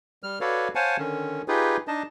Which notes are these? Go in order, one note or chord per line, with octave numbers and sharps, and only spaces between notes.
G3 F6
F#4 A4 B4 C#5 D5 F5
C5 C#5 F5 F#5 G#5 A5
D3 D#3 C#4
D#4 F4 G4 G#4 B4
D4 D#4 D#5 A5